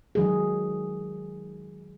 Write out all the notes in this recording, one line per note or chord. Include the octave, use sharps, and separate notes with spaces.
D#3 F#3 G#3 G#4